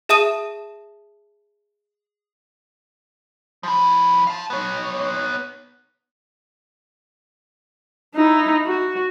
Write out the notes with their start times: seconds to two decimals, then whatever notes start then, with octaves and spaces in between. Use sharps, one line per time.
0.09 G#4 E5 A5 D#6 D#7 E7
3.63 F3 E4
4.27 F5 A5
4.50 B3 C#5
8.14 D#4 E4
8.64 F#4